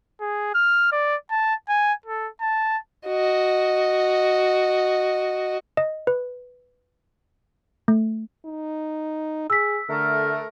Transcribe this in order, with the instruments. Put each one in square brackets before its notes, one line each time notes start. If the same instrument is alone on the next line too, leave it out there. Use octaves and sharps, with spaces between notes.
[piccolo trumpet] G#4
F6
D5
A5
G#5
A4
A5
[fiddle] F#4 D#5
[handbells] D#5
B4
A3
[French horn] D#4
[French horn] G#4 [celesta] E6 B6
[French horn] D3 [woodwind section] A3 A#4